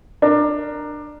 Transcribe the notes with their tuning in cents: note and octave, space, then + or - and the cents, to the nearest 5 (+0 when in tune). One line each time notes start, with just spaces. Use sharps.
D4 +20 A#4 +0